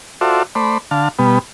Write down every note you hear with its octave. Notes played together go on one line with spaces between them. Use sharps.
F4 F#4 A4 C5 D5 E5
A3 C5 D5 B5
D3 F5 A5
B2 G3 B3